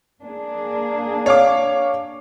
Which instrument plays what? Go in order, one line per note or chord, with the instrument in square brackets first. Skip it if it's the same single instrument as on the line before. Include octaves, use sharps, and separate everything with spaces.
[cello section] A#3 D4 G#4
[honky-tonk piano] C#5 F5 D6